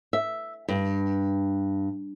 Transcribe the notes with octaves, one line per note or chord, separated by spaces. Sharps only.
E5
G2